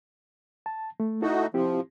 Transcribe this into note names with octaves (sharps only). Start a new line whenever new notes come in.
A5
A3
A3 D#4 E4 F#4 A4
F3 C4 E4 G4